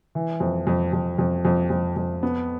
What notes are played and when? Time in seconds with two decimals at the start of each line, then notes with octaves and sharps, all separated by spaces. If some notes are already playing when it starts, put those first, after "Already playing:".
0.15 E3
0.40 F2
0.67 F2
0.93 F2
1.18 F2
1.45 F2
1.70 F2
1.96 F2
2.23 B3